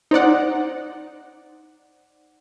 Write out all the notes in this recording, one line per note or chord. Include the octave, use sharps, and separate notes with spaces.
D#4 C5 D5 F#5